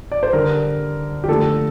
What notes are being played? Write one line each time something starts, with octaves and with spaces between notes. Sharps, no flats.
D5
C5
D3 G3 A#4
G4
D3 F3 A3 A4